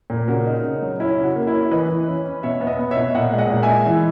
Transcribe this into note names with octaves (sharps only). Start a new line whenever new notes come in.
A#2
C#3 F#4 A#4
D#4
C#3
F#3
C#4 E4
C#3
F#4
A#3
E4
C#4
E3 B4 D#5
E3
C#4
C#4
B2 C#5 E5
B3
B4 D#5
B3
C#5 E5
B2
A#2 D#5 F#5
G#3
D#5 F#5
A#2
E5 G#5
G#3
E3